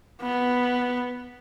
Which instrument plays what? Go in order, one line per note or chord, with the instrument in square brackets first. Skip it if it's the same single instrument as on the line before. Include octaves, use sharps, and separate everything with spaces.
[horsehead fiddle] B3